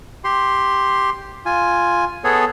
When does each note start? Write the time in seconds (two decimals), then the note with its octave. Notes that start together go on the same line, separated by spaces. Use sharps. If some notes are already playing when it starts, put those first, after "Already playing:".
0.24 G4 C6
1.46 F4 G#5
2.24 B3 G#4 A4 C#5